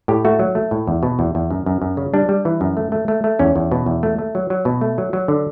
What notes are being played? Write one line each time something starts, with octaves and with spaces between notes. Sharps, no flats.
A2 G4
A3 F#4
F#3
A3
A2
E2
B2
E2
E2
F#2
F#2
F#2
C#3
G3 D4
G3
E3
F#2
A3
A3
A3
A3
E2 C#4
E2
B2
E2
A3
A3
F#3
F#3
B2
A3
F#3
F#3
D3